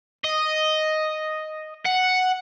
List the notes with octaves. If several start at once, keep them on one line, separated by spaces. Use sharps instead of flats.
D#5
F#5